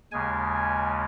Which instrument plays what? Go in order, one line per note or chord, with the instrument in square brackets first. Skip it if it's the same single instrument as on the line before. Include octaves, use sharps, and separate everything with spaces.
[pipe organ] D#2 C#3 G#3 G#5